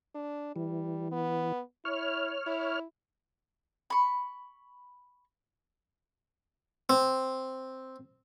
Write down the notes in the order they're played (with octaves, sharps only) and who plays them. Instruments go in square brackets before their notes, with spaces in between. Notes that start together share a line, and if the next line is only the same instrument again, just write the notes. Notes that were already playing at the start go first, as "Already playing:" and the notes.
[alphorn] D4
[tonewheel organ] E3 [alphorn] G3
[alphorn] B3
[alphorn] E4 [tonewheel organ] C#5 F6
[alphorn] E4
[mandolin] B5 C#6
[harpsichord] C4